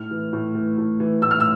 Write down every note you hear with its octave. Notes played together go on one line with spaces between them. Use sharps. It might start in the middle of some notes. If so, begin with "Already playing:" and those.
Already playing: A2 F6
E3
A2
E3
A2
E3
A2 E6
F6
E6